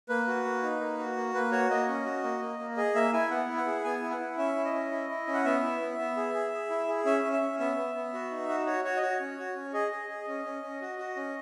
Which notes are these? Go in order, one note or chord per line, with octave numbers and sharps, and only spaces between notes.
A#3 B4
F#4
A#3
D#4
A#3
F#4
A#3
A#3 B4
F#4 C#5
A#3 D#5
C#4
F#4
A#3
A#3
A#3
G#4 D#5
A#3 E5
E4 G#5
B3 F#5
E4
F#5
G#4
B3 G#5
E4
F#5
E4
C#4 E5
E4
D#5
C#4
E4
E4
C#4
F#5
B3 E5
E4
B3
B3
G#4
G#4
G#4
E4
G#4
C#4 E5
C#4
E5
C#4
B3 E5
B3
B3
F#4
D#4
F#4
F#4 C#5
F#4 C#5
D#5
F#4 C#5
C#4
F#4
C#4
G#4 D#5
G#4
G#4
C#4
C#4
C#4
F#4
F#4
C#4